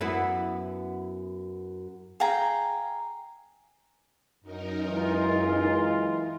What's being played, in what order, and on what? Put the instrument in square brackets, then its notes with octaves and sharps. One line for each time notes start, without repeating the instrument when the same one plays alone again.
[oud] F#2 B3 E4
[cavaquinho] G#4 F5 G5 A#5
[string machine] F#2 D#4 A#4
[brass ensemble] E3 G#3 F4